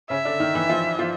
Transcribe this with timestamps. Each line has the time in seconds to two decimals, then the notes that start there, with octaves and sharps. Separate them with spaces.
0.10 C#3 C#4 E5
0.25 D3 D4
0.39 D#3 D#4
0.54 E3 E4
0.69 F3 F4
0.99 F3 F4